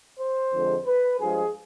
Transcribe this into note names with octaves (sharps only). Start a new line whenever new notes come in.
C5
F2 D3 F3 G#3
B4
G2 F3 G#3 G#4